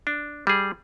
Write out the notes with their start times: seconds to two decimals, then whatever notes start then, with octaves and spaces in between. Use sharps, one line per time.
0.07 D4
0.47 G3 G#4